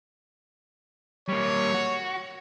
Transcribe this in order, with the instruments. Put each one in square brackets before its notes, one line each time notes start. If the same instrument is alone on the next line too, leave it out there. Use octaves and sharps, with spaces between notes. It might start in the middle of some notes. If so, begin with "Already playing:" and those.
[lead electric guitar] G3 A#3 [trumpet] C#5
[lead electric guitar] F#4